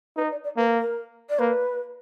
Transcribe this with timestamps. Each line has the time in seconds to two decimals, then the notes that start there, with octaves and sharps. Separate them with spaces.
0.16 D#4 B4
0.31 D5
0.44 D5
0.57 A#3 B4
0.78 A#4
1.29 D5
1.40 A#3 B4